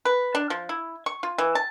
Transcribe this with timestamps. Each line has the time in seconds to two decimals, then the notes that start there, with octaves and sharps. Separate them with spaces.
0.05 B4
0.35 D4
0.50 F3
0.69 E4
1.06 C#6
1.23 F4
1.38 E3
1.55 A5